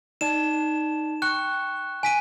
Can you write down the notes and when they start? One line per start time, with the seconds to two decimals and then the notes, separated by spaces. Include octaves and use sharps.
0.21 D#4 D5 A5 E7
1.22 G5 C#6 F#6 C#7
2.03 G#5 B6 D#7